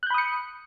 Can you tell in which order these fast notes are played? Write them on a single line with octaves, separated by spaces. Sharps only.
F#6 G6 B5 D#6 C#7